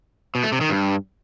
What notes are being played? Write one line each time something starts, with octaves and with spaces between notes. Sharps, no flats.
B2
A3
C3
D#3
G2